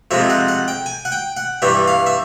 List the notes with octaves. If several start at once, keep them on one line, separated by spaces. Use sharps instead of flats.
F2 C3 F3 G#3 E5
F#5
F#5
G5
G#5
F#5
G5
F#5
G2 E3 G3 E5
F5
E5